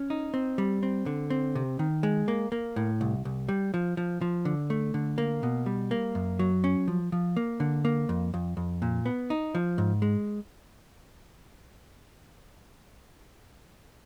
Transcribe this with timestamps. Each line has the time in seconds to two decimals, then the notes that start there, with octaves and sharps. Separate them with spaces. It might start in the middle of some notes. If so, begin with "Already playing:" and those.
Already playing: C#4
0.10 D#4
0.34 C4
0.58 G3
0.83 C4
1.06 D3
1.30 C4
1.55 C3
1.79 D#3
2.03 G#3
2.28 A#3
2.52 A#3
2.76 A2
3.01 C2
3.25 C2
3.49 G3
3.74 F3
3.97 F3
4.21 F3
4.45 D3
4.70 A3
4.94 D3
5.18 A#3
5.43 B2
5.66 G3
5.91 A#3
6.15 F#2
6.39 F#3
6.64 C#4
6.88 F3
7.12 F3
7.37 A#3
7.60 D3
7.85 A#3
8.09 F2
8.34 F2
8.57 F2
8.82 A#2
9.06 B3
9.30 D#4
9.55 F3
9.78 G#2
10.02 G#3